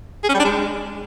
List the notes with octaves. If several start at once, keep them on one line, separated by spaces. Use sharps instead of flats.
G#4
C#4
G3
D4
G#3